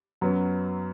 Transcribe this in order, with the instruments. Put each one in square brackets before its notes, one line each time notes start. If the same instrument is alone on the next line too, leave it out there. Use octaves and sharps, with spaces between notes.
[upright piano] F#2 F#3 B3